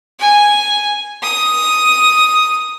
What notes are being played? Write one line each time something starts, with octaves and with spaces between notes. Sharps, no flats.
G#5
D#6